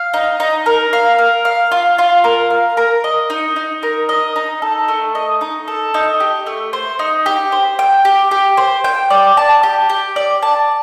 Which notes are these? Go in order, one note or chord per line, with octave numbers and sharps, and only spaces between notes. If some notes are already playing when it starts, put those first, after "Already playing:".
Already playing: F5
D#4
D#4
A#4
F5
A#4
F5
F4
F4
A#4
F5
A#4
D#5
D#4
D#4
A#4
D#5
D#4
A4
A3
D#5
D#4
A4
D#4
G4
A3
C5
D#4
G4
C5
G5
G4
G4
C5
G5
D5
A5
G4
G4
D5
A5